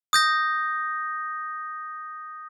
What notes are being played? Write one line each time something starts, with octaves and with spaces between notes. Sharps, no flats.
D#6 G6 A#6